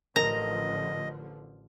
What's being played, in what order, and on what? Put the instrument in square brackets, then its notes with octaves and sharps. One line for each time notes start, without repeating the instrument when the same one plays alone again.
[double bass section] A1 D3 F3 [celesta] A#4 [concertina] D#5 [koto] A#5